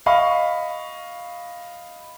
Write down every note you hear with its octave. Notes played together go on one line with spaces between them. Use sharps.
D#5 F5 B5 C#6